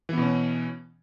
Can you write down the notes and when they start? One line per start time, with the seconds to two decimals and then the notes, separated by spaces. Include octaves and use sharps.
0.09 E3
0.13 B3
0.17 B2
0.22 C#4